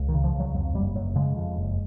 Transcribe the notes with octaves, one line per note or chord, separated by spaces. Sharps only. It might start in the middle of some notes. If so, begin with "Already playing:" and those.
Already playing: C#2
D#3
C#3
F3
C#2
F#3
F2 F#3
F#1 G3
F#1 F#3
C#3 G#3
F2
F#1